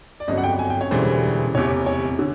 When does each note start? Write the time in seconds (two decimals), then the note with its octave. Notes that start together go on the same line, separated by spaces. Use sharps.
0.20 D5
0.28 G1 F2 C#3 F#3 D#5
0.38 F#5
0.44 G5
0.59 G#5
0.70 G5
0.81 C#5
0.91 E1 D2 C#3 E3 G3 C5
1.54 F1 E2 C3 C#5
1.86 C#5
2.19 D3